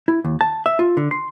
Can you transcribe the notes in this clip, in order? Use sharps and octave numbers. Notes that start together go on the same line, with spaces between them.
E4
D#2
A5
E5
F4
D3
C6